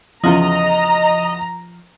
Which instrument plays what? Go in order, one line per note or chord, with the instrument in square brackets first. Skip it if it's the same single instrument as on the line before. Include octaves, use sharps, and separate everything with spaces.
[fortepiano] E2 C#3 F4 [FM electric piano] F3 [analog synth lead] D#5 [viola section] A#5